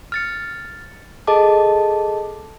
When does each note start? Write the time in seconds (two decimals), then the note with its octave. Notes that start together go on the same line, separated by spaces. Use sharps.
0.12 F6 A6 C#7
1.27 G#4 A4 D#5 A5 D6